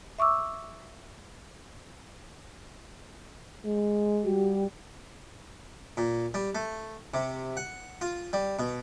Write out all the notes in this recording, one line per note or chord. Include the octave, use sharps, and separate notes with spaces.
E5 C#6 D6 E6
G#3
G3 F#4 G4
A#2
G3
A3
C3
F#5
F4
G3
B2